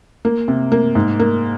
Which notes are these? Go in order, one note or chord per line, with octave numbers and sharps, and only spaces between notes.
A#3
C3
A#3
G#2
A#3